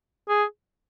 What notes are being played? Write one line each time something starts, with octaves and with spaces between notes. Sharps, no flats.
G#4